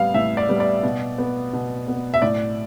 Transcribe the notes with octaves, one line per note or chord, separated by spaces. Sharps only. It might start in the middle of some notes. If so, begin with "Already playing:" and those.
Already playing: A2 G3 B3 F5
A2 E5
D5
G3 B3
D5
B2
B3
B2
B3
E5
A2 D5